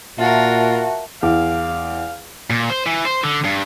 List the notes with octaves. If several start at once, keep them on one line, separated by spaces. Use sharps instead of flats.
A#2 F4 F#4 A#4 E5 A5
E2 F5
A#2
C5
E3
C5
D3
G2